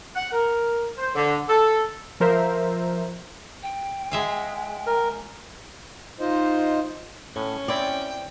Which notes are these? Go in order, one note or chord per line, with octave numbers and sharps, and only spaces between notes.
F#5
A#4
C5
D3
A4
F3 A#4 C5 E5
G5
G#3 E5 F5
A#4
D#4 F4 C5 D#5
A2 C#4
C4 E4 D5 G5